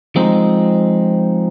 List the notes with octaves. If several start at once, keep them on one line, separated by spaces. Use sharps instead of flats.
F3 G#3 C4 D#4